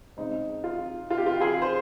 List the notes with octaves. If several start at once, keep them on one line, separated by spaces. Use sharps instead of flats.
C#3 G#3 C4 D#4
F4
F4
G4
F4
F4 G#4
C5